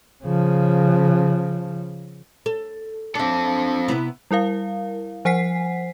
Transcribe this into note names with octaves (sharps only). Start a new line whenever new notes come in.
C#3 F3
A4
C4 D4 A4 E5
C3 B3 E4
G3 E4 A#4 F5
F3 C5 F#5 G#5 B6 C7